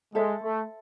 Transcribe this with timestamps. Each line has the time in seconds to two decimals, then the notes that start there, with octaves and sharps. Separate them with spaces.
0.15 G#3 A4 C5 E5
0.43 A3